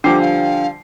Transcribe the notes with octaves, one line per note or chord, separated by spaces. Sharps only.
D3 F3 G3 D4 G5 D6 C7
F5